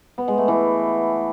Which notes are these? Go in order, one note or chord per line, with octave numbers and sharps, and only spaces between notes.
B3
G#3
A3
E3